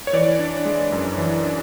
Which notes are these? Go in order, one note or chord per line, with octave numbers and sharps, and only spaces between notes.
C#5
E3 D5
D4
G#3
F#2
E3
D4